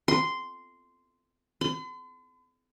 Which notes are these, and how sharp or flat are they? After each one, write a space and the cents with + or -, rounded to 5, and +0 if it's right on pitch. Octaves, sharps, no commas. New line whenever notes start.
C6 -10
C6 -45